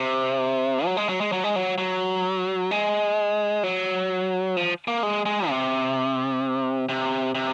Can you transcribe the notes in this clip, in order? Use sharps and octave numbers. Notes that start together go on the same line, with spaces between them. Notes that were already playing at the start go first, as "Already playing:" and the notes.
Already playing: C3
F#3
G#3
F#3
G#3
F#3
G#3
F#3
F#3
G#3
F#3
F3
A#3
G#3
G#3
C3
C3
C3